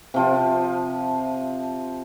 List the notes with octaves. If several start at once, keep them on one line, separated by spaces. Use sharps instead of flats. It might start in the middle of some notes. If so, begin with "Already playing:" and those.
C3 F3